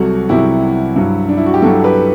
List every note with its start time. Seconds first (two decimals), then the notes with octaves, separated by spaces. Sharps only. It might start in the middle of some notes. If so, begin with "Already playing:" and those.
Already playing: C2 C3 F#3 F#4 A4
0.29 C2 C3 F#3 E4 G4
0.96 G2 F#3
1.29 D4
1.37 E4
1.46 F#4
1.54 G4
1.62 G2 F#3 F#4 A4
1.84 G4 B4